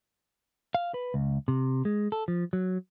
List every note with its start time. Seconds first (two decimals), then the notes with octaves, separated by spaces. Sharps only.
0.75 F5
0.94 B4
1.14 C#2
1.48 C3
1.85 G#3
2.12 A4
2.28 F3
2.53 F#3